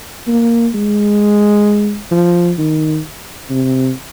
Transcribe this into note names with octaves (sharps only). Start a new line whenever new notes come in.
A#3
G#3
F3
D#3
C3